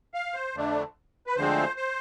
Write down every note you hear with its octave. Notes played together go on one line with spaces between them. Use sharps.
F5
C5
F2 D3 A3 D4
B4
D2 D3 F3 G#3 C4 C5
C5